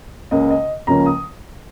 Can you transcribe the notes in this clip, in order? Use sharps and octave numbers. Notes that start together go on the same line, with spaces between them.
C#2 C#3 A#3 C#4 D#5
D#5
C#2 C#3 F3 A#3 C#4 A#5
D#6